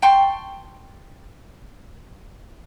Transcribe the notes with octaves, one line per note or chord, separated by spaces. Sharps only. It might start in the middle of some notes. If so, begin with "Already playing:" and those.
G5 A5 C6 C#6